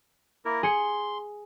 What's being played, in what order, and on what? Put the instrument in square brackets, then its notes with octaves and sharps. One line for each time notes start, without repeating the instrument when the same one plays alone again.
[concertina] A#3 E4 A#4
[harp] G#4 C#7 [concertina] C6